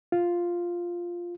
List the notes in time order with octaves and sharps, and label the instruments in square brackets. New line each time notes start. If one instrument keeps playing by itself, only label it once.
[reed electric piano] F4